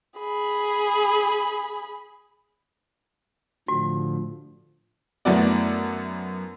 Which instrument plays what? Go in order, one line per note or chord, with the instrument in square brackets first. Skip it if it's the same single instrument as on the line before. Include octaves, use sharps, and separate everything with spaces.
[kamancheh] G#4 B5
[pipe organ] A2 D3 F3 [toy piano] F#4
[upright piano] F#2 A3 B3 E4 F#4 D5